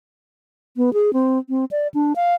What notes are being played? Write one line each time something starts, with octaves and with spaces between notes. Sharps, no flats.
B3
G#4
C4
C4
D5
D4
F5